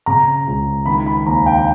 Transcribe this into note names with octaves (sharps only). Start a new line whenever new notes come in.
C#3 A#5
C#2
D#3 B5
B5
D#2 A#5
G5
G5